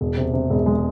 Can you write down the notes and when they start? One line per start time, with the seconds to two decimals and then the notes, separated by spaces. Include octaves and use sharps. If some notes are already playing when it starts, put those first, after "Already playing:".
0.01 E1
0.17 C3
0.34 C3
0.50 E1
0.66 G#3